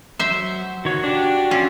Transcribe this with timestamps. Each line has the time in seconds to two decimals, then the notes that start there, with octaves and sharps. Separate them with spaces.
0.19 F#3 C5 E5
0.85 D#3 F#4 C#5
1.04 D4 G4
1.51 C#4 F4 G4 E5